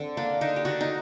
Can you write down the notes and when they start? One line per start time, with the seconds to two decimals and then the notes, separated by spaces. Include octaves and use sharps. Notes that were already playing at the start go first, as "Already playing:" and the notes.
Already playing: D3 C4
0.17 A#3 D4
0.41 D3 D#4
0.56 G4
0.65 D3 F#4
0.81 D#4